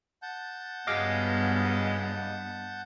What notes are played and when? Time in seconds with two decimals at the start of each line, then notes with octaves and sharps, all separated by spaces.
0.22 F#5 A5 G6
0.87 G2 C#3 F#3 G#3 B3 D#5 F5 D6